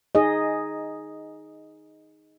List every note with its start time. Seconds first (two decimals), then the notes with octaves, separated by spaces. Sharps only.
0.15 D#4 G#4 D#5